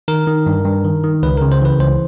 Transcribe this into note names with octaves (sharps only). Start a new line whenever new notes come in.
D#3 A#4
D#3
G2
G2
D#3
D#3
C#2 B4
C#3 A#4
C5
E3 B4
C#2 C5